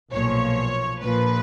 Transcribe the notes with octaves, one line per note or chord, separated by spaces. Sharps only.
B1 A#2 F3 C#5
A#1 A#2 F3 B4